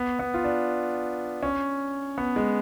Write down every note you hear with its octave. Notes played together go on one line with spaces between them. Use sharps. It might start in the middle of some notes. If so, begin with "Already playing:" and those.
Already playing: B3
B3
F4
D4
C#4
B3
G#3